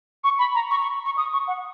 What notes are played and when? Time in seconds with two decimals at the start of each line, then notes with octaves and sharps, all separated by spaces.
0.24 C#6
0.39 B5
0.55 A#5
0.71 C#6
0.82 C#6
1.05 C#6
1.17 D#6
1.33 C#6
1.48 F#5